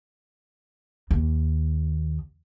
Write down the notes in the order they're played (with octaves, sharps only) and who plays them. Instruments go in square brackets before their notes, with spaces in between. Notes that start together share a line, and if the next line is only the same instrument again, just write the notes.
[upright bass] D#2